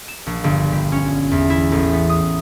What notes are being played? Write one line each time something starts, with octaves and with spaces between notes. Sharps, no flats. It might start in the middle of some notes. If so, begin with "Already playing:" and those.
E7
A#1
G1
G3
C#4
E2
E4
A1
B3
D#6